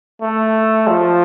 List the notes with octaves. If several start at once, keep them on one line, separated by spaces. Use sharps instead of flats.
A3
F3